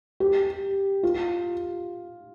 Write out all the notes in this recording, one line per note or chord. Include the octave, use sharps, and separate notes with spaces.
G4
F4